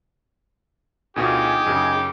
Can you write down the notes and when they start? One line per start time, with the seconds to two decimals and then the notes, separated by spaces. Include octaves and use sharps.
1.16 D2 B2 D#4 F4 G4 G#4
1.66 F#2 C#3